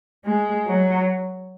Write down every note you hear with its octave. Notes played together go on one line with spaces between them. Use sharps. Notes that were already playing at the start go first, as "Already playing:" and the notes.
G#3
F#3